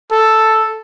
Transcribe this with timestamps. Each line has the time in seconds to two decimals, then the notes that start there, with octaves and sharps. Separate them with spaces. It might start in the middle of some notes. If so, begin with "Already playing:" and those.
0.11 A4